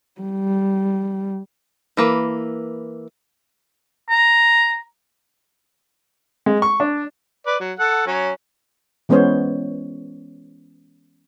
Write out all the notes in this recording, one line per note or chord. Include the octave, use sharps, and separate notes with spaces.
G3
E3 A#3 B4
A#5
G#3
C#6
D4
B4 D5
F#3
A4 F#5
F#3 C#4
E3 G#3 B3 C#4 C5 C#5